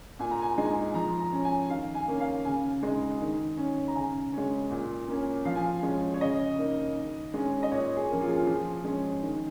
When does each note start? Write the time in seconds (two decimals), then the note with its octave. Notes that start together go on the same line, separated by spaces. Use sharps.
0.19 A#2 G#5
0.31 A#5
0.42 G#5
0.53 G#3 D#4 A#5
0.65 G#5
0.94 F3 A#5
1.20 A#5
1.32 C#4
1.45 G#5
1.70 D#3 F5
1.95 G#5
2.08 A#3 C#4
2.20 F5
2.45 C#3 G#5
2.83 G#3 D#4
3.21 D#3
3.57 C#4
3.88 A#5
3.95 C#3 G#5
4.33 G#3 C#4
4.70 A#2
5.08 A#3 C#4
5.45 F3 F5
5.55 G#5
5.65 F5
5.83 G#3 C#4
6.14 C#5
6.21 C#3 D#5
6.58 A#3 D#4
6.96 D#3
7.34 G#3 C#4
7.63 D#5
7.71 A#2 C#5
7.97 G#4
8.09 F3 A#3 C#4
8.21 F4
8.29 G#4
8.37 F4
8.47 F3 G#4
8.84 G#3 C#4
9.22 D#3